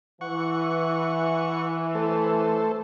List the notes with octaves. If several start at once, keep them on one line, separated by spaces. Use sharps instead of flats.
E3 F#5 C#6
A3 A4 C5